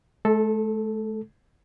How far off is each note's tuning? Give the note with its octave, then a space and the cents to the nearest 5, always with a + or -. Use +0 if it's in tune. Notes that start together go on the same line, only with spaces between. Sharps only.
A3 -45 A4 +0